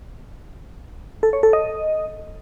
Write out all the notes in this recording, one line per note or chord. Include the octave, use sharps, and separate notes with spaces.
A4
C#5
A4
D#5